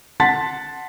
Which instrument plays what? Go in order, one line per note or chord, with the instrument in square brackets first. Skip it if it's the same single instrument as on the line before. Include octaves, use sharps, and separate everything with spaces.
[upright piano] F#5 A5 C6 A6 B6